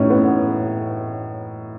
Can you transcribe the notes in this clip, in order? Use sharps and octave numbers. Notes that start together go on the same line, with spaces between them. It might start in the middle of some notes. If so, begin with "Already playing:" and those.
Already playing: A2 E3 C#4 D#4 E4
B3